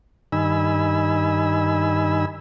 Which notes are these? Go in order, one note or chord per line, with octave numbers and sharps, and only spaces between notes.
G2 D#3 D#4 G#5 B5 E6